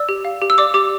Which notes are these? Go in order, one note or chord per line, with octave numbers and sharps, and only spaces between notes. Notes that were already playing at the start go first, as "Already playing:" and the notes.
Already playing: D5 E6
G4
F5
G4
E6
D5 D6
G4 D6